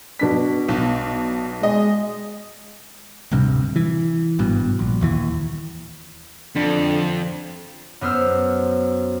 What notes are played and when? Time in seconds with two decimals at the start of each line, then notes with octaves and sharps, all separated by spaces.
0.19 B2 D4 B6
0.68 B1
1.63 G#3 D#5
3.32 D1 G1 G2 C3
3.76 E3
4.39 G#1 G2 B2
4.79 A#1
5.01 D#1 D#2 E3
6.55 F2 D3
8.01 F#2 B3 C5 E6 F6